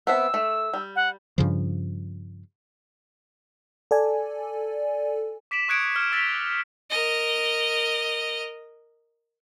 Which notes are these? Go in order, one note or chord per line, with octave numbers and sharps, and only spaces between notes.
B3 C4 E5 E6
A3
G3
F#5
G2 C#3 F3
A4 D5 G#5
D6 B6 D7 E7 F#7
C#6 D#6 F#6 G#6 C#7 D7
D6 F6 F#6 B6 C#7
C#6 E6 A6 B6 F7 G7
A#4 D#5